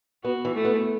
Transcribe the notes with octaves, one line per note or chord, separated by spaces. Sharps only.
B3 F#4
E3
A3
B3